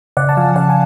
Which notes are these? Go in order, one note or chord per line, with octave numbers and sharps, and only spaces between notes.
C#3 D5 F#5
A5
F3 F5 G#5
C#3 D5 F#5
G#5